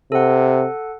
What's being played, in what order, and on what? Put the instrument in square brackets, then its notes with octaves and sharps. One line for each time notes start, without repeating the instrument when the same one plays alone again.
[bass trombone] C3 [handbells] A4 F#5